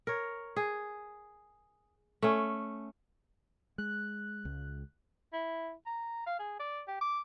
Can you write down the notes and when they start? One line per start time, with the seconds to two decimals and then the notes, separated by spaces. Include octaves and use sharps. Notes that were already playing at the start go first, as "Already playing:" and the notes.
0.07 A#4 C#5
0.56 G#4
2.22 A3 C#4
3.78 G#3 F#6
4.45 C#2
5.33 E4
5.86 A#5
6.27 F5
6.39 G#4
6.60 D5
6.87 G4
7.01 D6